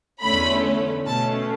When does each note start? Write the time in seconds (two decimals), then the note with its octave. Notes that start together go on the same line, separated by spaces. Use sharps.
0.22 E2 D3 A3 C#4 B5
1.06 B2 A3 C#4 A5